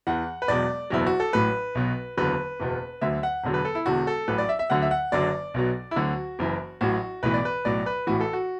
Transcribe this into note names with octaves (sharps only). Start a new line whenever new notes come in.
E2 E3 F#5
B4
E1 E2 B2 F#3 D5
F#1 E2 B2 F#3 E4
F#4
A4
A1 A2 F#3 B4
B1 B2 F#3
F#1 E2 D3 F#3 B4
F#1 E2 B2
D2 D3 F#3 E5
F#5
E1 E2 D3 F#3
B4
A4
E4
E1 E2 D3 F#4
A4
A1 A2 F#3 B4
D5
E5
E5
D2 D3 F#3 F#5
E5
F#5
F#1 F#2 D3 F#3 D5
B1 B2 F#3
E4
D2 D3 F#3 F#4
F#1 F#2 E3
A1 A2 F#3 F#4
B1 A2 E3 B4
D5
B4
B1 A2 F#3 D5
B4
A1 A2 E3 F#4
A4
F#4